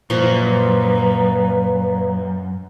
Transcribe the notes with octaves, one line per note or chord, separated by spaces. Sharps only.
F#2 A#2 F3 A#4 B4